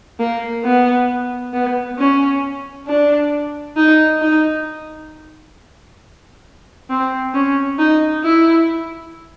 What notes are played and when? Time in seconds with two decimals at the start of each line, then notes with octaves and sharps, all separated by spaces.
0.19 A#3
0.64 B3
1.53 B3
1.98 C#4
2.87 D4
3.77 D#4
4.22 D#4
6.90 C4
7.34 C#4
7.79 D#4
8.24 E4